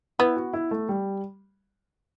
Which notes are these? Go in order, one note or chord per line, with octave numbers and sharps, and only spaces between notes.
B3 E4
F#4
E4
A3
G3